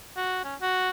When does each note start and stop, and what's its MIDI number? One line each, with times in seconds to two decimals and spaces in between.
0.17 0.43 66
0.44 0.55 61
0.61 0.90 66